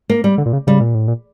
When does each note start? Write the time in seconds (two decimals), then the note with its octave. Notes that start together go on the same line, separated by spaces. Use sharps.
0.09 A#3
0.24 G3
0.38 D3
0.46 A#2
0.53 C#3
0.67 C#3 G3
0.81 A#2
0.94 A2
1.08 A#2